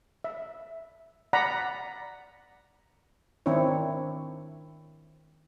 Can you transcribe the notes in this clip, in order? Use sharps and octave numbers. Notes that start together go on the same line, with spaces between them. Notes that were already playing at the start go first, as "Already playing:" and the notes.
E5
D5 F#5 A#5 B5
D#3 C4 D4 E4 C#5